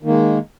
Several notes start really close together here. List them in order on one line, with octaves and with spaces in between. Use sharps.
D#3 A#3 G#3